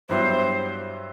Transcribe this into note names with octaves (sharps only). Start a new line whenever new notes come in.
G2 F#3 B3 E4 G4 C5